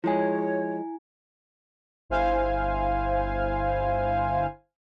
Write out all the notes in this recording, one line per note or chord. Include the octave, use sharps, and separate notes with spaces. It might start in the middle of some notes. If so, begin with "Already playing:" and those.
F3 G#3 E4 G#4 C#5 G#5
G1 E4 C5 F5 G#5